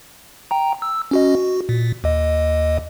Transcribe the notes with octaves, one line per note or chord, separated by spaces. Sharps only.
G5 A#5
E6
C#4 F#4 D#5
F#4
A#2
D#2 D#5